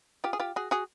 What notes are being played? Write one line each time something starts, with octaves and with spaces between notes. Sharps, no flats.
F4 G4
G#4
F4 G4
F#4 G#4
F#4 G#4